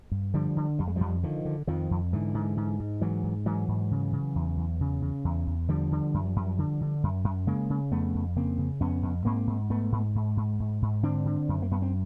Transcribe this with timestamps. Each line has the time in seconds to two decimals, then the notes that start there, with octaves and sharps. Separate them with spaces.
0.11 G2
0.34 D3 F3 G3
0.57 D3
0.79 F2 G3
0.87 G#3
0.96 F2 F3 G3
1.23 D3 D#3 F3
1.45 D3
1.67 F2 D#3 F3
1.91 F2
2.13 G#2 D3 E3
2.34 G#2
2.57 G#2
2.80 G#2
3.01 G#2 E3 F#3
3.23 G#2
3.46 G#2 E3 F#3
3.68 G#2
3.91 C#3
4.13 C#3
4.35 E2
4.57 E2
4.81 C#3
5.02 C#3
5.25 E2
5.47 E2
5.68 D3 F3 G3
5.91 D3
6.14 F#2
6.36 F#2
6.58 D3
6.81 D3
7.03 F#2
7.24 F#2
7.47 C#3 G#3 A#3
7.70 C#3
7.91 F2 A3 B3
8.14 F2
8.36 C#3 A#3 C4
8.58 C#3
8.80 F2 B3 C#4
9.03 F2
9.25 G#2 A#3 C4
9.47 G#2
9.70 G#2 A3 B3
9.92 G#2
10.15 G#2
10.37 G#2
10.60 G#2
10.82 G#2
11.03 D3 C4 D4
11.25 D3
11.49 F#2
11.62 A#3
11.71 F#2 B3
11.82 C4